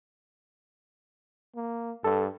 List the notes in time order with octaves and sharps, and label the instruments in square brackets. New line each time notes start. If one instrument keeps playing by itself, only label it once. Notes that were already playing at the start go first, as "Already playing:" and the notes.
[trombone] A#3
[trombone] G2 [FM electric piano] A4